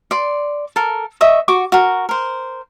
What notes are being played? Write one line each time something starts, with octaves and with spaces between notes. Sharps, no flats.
D5 C6
A4 A#4
D#5 E5 C#6
F#4 C#6 D6
F#4 A#4
A#4 C5